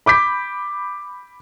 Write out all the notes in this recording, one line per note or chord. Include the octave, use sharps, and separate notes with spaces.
B5 D6 G6 B6